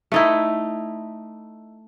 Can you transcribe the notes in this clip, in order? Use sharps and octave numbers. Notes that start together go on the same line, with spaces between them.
A3 D#4 E4